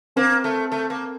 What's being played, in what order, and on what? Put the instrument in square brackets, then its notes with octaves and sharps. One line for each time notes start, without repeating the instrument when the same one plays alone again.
[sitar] A#3 [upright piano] C4
[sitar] A3
A3
A#3